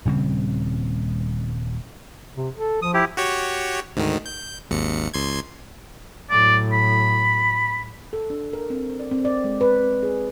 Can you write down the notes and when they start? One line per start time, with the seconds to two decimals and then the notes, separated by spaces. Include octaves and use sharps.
0.05 D#1 C#3 G3 C4
2.36 C3
2.54 A4
2.82 F3 D#6
2.94 E4 G4
3.17 F#4 G4 C#5
3.96 D2 G#2 D#3
4.26 G6
4.70 G#1 D#2 C#7
5.14 C#2 C6 G#6
6.30 A2 F#3 D5
6.72 B5
8.13 A4
8.30 D4
8.53 A#4
8.70 C4
8.99 D5
9.11 C4
9.25 D5
9.44 G#3
9.61 B4
9.82 C4
10.03 G#4